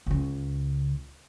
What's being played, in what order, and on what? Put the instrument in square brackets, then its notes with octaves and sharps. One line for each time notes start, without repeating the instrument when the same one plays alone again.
[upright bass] C#2 C#3